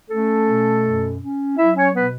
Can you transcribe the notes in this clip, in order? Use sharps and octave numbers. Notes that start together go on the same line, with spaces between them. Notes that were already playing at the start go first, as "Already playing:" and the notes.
A3 C#4 A4
B2
F#2
C#4
F#3 E4 E5
C#4 C#5
B2 B3 B4